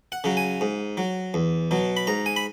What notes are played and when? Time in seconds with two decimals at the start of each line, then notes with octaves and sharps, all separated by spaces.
0.12 F#5
0.24 C#3 F#3
0.37 G#5
0.61 G#2
0.97 F#3
1.34 E2
1.71 B2 F#3
1.97 B5
2.07 G#2 A#5
2.26 G#5
2.36 B5